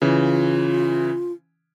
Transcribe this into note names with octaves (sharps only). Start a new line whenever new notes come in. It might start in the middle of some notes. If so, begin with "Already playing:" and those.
C#3 E3 F4